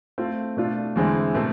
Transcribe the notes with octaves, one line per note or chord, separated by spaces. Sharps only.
A3 C4 F4
B2 A3 D4 F4
E2 D3 G#3 C4 E4
B2 A3 C4